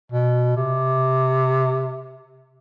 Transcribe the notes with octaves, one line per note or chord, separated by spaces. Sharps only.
B2
C3